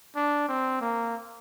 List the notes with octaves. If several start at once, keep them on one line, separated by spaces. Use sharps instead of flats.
D4
C4
A#3